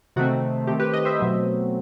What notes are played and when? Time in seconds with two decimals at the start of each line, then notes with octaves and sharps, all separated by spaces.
0.16 C3 D#3 A3 C4 F#4
0.67 D#3 A3 C4 G4
0.80 G4 B4
0.93 B4 D#5
1.05 C5 E5
1.18 B2 F#3 A3 C4